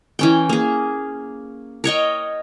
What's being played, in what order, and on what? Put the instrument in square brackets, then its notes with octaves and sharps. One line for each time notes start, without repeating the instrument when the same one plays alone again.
[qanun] E3 C#4 G5
A#3 G#4
A#4 C#5 D#5 G5